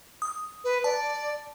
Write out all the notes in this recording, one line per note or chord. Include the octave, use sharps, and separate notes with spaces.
D#6
B4
D5 A5